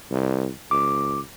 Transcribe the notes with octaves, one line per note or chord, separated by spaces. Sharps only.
C2
C#2 D6